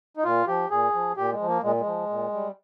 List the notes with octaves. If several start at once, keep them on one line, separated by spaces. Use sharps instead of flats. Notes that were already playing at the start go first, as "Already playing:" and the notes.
D#4
A#2 F4
F3 G4
A#2 G#4
F3
A#2 G4
G#3
F3
A#3
A#2 G#3
G#3
F3
A#2
G3